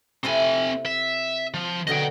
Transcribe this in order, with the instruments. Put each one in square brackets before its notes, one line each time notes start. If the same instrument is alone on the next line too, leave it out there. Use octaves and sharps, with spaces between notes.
[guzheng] C3 E4 A4 [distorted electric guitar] C4 G#5
[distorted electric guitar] E5
F3
[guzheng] B2 D3 F#3 [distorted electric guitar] D#5 G5